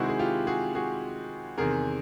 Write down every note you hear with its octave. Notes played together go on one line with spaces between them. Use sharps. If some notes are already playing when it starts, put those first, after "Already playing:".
Already playing: C3 D#3 G#3 C4 E4 F#4
G#4
F4 G4
F#4 G#4
F#4 G#4
E2 C3 D#3 G#4 A#4